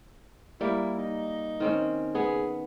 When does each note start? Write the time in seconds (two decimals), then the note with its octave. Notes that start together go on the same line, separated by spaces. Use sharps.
0.61 G3 A#3 E4
0.98 D#4
1.60 D#3 C4 C#4
2.15 B3 G#4